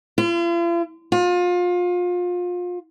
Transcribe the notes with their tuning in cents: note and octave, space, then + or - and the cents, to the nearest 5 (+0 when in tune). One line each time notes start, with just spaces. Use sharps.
F4 -45
F4 +30